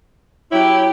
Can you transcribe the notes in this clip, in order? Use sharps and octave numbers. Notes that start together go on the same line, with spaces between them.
F#3 C#4 E4 G4